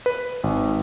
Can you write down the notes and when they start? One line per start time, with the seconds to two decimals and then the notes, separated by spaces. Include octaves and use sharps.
0.06 B4
0.44 G#1